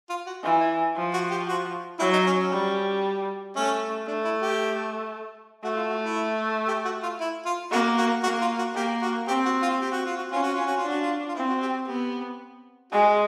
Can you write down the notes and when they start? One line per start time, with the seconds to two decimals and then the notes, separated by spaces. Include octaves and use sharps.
0.09 F4
0.26 F#4
0.43 E3 F4
0.60 E4
0.96 F3
1.13 F#4
1.31 G4
1.48 F#4
1.99 F#3 E4
2.13 D#4
2.26 C#4
2.39 C#4
2.52 G3
3.56 A3 C#4
4.07 A3 D4
4.24 E4
4.42 G4
5.64 A3 F#4
5.76 F4
5.89 F#4
6.02 E4
6.68 G4
6.85 F#4
7.03 F4
7.20 E4
7.45 F4
7.71 A#3 F#4
7.98 F#4
8.23 A#3 F#4
8.41 F4
8.58 F#4
8.75 A#3 G4
9.02 F#4
9.27 C4 G4
9.45 F#4
9.62 F4
9.80 G4
9.92 F#4
10.05 F4
10.17 F#4
10.32 C#4 F4
10.43 F#4
10.54 F4
10.66 F#4
10.77 F4
10.83 D4 F#4
11.00 F4
11.28 F4
11.35 C4 E4
11.49 F#4
11.62 G4
11.87 B3 G4
12.91 G#3 F#4